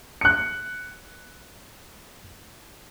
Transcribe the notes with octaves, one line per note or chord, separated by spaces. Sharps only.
F#6 C#7